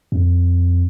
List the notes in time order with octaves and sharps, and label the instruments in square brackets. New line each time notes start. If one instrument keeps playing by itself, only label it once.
[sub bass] F2